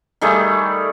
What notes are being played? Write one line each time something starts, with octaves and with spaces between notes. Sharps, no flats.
D#3 G3 A3 G#4